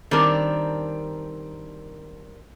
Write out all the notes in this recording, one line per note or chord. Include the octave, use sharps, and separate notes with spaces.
D#3 G3 C4 D4 A#4